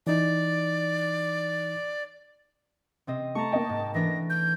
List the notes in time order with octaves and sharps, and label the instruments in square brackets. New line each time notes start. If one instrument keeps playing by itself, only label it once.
[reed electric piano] E3 D#4 [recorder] D5
[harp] C3 C4 D#5
[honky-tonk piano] A3 [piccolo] A5 [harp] A#5 C#6
[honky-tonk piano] A#3 D#5 G5
[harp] G#2
[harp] E3 A3 D4 [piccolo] A#6
[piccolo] G6